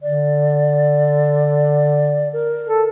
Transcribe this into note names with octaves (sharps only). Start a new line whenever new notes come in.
D3 D5
A#4
A4